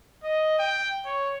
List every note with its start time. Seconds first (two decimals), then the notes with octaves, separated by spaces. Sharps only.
0.24 D#5
0.59 G5
1.05 C#5